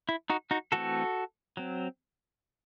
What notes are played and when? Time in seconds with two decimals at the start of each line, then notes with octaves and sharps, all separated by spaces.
0.09 E4
0.30 D#4 F#4
0.51 D#4 F#4
0.72 E3 A3 C4 F#4 A4
1.57 F#3 C4